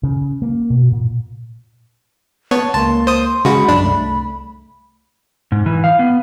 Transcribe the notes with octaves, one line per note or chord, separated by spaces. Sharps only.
C#3
A#3
B2
A#2
B3 C#5 A5 C#6
C#2 A#3 A5 C6
C5 D#6
C#3 G#3 F#4 B5
A#1 F#2 D4
C2 A3
G#2
E3
F5
B3